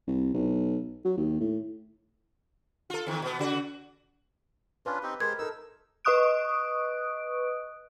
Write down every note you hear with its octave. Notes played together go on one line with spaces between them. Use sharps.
C2
B1
F#3
D#2
A2
F4 A4
E2 D#3
B2 B3
C#3 F#4
C#4 D4 F4 B4
C4 D#4 G4
G#3 G4 A#4 C5 G#6
D#4 A4 A#4 E6
B4 D#5 C#6 D#6 F#6 D7